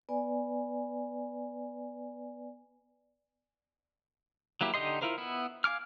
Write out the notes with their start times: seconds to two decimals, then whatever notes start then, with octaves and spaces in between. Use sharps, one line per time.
0.09 B3 B4 D5 G#5
4.61 F#3 A#3 E4 G4
4.74 D3 D#4 G4 D#5 C6
5.02 E4 F4 A#4 C5
5.18 B3 E4
5.64 F5 G#5 D6 F6